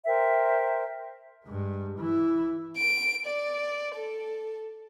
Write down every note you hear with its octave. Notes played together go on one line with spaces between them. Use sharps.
A#4 C5 E5 G5
G2 G#3
E3 E4
D7
D5
A4